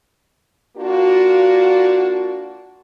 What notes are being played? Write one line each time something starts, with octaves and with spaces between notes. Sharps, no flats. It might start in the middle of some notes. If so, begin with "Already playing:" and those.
A#3 D4 F4 F#4